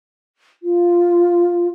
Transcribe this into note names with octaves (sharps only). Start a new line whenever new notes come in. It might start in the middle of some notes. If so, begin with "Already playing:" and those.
F4